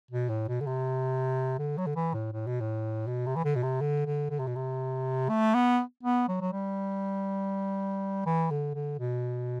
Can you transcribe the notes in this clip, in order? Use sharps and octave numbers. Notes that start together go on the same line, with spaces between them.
B2
A2
B2
D3
C3
D3
F#3
D3
E3
A2
A2
B2
A2
B2
C3
E3
D3
B2
C3
D3
D3
D3
C3
B2
C3
A3
B3
B3
F#3
F#3
G3
E3
D3
D3
B2